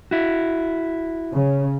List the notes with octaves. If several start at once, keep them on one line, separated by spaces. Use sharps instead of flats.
E4 F#4
C#3